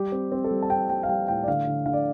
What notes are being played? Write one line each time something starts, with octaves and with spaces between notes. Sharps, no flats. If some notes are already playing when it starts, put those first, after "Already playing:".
Already playing: G3 G4
C4
C4
A4
G3
A5
C4 G5
G3 G5
F5
G3 G5
A2 G5
D5
D3 F5
D3
D3 F5
D5